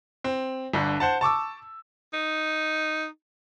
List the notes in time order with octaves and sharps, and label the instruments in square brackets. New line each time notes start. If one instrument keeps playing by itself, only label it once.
[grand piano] C4
G1 D3
C5 F#5 A5
A5 C#6 D6 E6
[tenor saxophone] D#4